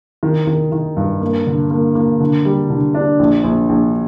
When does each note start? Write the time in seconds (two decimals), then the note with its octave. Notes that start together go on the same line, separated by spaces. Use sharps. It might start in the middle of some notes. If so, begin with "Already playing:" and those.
0.23 D#3
0.47 D#3
0.72 D#3
0.97 G2
1.21 A#3
1.47 D3
1.71 A#3
1.95 A#3
2.20 D3
2.45 G3
2.70 D3
2.95 D4
3.19 A#1
3.44 A#1
3.69 A#1